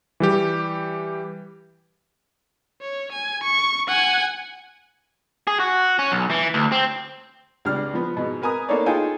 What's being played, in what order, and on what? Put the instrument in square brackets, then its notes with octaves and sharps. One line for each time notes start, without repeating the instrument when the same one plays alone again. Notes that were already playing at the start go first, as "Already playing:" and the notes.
[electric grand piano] E3 G3 G4
[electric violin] C#5
G#5
C#6
F#5 G#5
[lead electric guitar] G#4
F#4
C#4
B1
E3
D2
C4
[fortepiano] C#2 G3 D4 F6
F3 B3
G#2 B2
A#4 B4 G#5 A#5 D#6
A#3 B3 D#4 A4 C#5 D5
D#4 F4 G#4 A4 G5 G#5